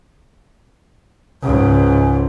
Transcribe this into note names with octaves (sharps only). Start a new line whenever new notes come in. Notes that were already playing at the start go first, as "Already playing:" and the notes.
C#2 G#2